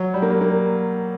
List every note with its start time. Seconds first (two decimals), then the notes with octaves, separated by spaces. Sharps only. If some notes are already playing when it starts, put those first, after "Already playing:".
Already playing: F#3
0.14 G3
0.22 A#3
0.30 G3
0.41 A#3